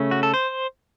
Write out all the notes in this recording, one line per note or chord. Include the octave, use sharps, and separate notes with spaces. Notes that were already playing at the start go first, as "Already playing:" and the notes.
Already playing: C#3 A3 C#4
F#4
A4
C5